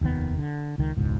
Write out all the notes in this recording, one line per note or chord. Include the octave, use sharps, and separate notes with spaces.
F1 D#2 D#3 B3
D3
C#2 D#3
E1 C#2 G#2